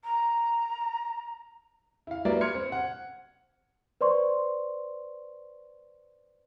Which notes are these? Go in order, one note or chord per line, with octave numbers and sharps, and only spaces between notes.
A#5
E4 F5
F#3 G3 A#3 B4 D5 E5
C6 F6 G#6 C#7
C4
F#5
B4 C5 D5 C6 C#6